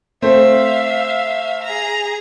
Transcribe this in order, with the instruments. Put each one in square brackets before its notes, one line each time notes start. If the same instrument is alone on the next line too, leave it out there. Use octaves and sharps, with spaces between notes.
[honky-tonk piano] A3 C4 C5 [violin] E5 F5
[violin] G#4 A#5